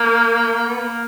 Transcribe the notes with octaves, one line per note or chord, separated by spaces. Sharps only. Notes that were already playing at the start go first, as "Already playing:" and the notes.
Already playing: A#3
B3
A#3